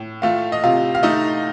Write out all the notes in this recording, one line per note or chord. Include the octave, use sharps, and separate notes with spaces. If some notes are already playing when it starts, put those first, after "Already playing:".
Already playing: A2
A3 F4 F5
D#5
C3 F4 F5
F5
A3 D#4 D#5